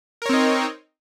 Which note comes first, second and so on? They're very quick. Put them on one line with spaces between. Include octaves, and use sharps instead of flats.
A#4 C#5 C4 D#4